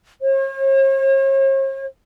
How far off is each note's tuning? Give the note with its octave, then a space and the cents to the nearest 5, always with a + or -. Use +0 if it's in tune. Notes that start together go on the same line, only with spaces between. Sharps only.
C#5 -45